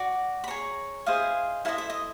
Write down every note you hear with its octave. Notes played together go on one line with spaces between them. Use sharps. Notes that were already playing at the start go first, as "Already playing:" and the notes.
Already playing: F#4 D5 D6
B5
G#4 C#5 A#5
E4 G#4 C5 D#5 F5
E4 A4 C5 D#5 F5
E5
D#5